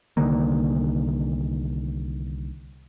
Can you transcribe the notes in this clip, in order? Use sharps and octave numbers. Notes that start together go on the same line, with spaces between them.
C2 D3 D#3 A#3